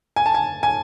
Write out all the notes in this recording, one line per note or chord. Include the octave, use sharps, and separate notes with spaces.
G#5
A5
G#5
G#5